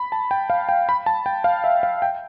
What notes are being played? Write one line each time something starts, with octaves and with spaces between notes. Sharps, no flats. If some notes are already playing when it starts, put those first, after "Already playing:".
Already playing: B5
A5
G5
F5
G5
B5
A5
G5
F5
E5
F5
G5